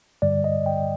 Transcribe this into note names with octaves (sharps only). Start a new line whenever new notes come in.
G2 D3 G3 D5
D#5
G5